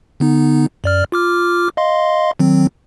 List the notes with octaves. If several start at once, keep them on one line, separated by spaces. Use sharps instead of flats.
D3 B3 D#4
F#2 D5 F6
F4 D6 F6
D#5 F5 C6
D#3 F#3 C4